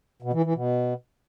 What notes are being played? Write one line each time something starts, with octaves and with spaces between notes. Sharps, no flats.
B2
E3
E3
B2